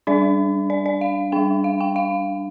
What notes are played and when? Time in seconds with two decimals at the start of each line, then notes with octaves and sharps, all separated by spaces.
0.07 G3 D4 D5
0.70 D5
0.86 D5
1.01 F5
1.32 G3 D4 G5
1.64 F5
1.81 G5
1.96 F5